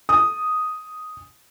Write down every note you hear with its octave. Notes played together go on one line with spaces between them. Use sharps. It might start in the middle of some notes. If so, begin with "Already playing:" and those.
D#6